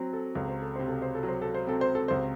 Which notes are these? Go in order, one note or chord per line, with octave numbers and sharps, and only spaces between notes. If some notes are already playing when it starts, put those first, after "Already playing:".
Already playing: F#3 C4
A4
C#2 A4
C5
A4
C3 C5
A4
C5
A4
F#3
C5
A4
C5
C4 A4
C5
A4
C#2 C5